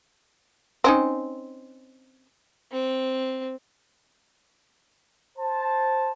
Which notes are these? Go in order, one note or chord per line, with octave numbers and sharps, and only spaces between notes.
C4 C#4 D#4
C4
C5 A5